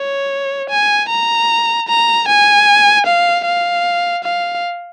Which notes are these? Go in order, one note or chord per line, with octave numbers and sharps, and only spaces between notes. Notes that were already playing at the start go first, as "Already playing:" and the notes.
Already playing: C#5
G#5
A#5
A#5
G#5
F5
F5
F5